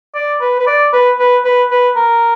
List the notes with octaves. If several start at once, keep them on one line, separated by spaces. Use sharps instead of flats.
D5
B4
B4
D5
B4
B4
B4
B4
A#4